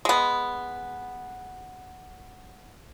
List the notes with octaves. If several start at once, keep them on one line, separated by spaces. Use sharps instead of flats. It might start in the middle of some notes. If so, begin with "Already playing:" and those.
G#3 B3